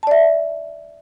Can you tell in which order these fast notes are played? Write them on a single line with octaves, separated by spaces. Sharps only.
A5 D5 E5